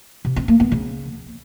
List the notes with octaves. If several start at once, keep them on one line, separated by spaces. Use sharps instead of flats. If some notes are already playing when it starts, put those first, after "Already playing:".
C3
C4
A#3
B3
C#3